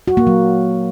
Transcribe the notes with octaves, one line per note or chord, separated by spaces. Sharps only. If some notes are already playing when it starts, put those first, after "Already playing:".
F#4
A#3
F#3